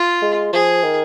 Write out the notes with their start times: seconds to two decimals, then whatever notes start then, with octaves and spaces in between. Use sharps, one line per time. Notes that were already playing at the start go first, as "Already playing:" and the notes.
Already playing: F4
0.22 G#3
0.53 F3 G#4
0.83 D#3